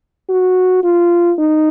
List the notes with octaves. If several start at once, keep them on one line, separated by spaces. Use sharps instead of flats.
F#4
F4
D#4